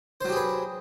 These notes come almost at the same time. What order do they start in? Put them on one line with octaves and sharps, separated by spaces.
C5 F#3 G4 G#4 B4